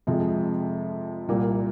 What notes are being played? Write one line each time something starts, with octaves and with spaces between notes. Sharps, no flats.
F2 C3 F3 G#3
C2 A#2 G3 A#3